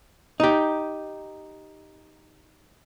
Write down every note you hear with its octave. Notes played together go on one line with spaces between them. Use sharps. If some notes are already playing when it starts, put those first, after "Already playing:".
D#4 G4